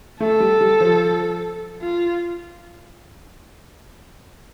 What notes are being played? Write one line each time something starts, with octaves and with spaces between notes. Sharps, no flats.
A3 A4
G3
G3
F3
F4